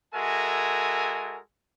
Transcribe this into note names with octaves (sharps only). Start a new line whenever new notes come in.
G#3 F#4 A4 A#4 E5 G#5